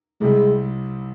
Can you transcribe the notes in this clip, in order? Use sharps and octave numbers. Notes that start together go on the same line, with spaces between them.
C2 C3 G3 G#3